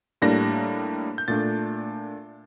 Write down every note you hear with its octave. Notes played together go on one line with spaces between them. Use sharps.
A2 G3 A#3 D4 A#6
G6
A#2 A3 D4 A6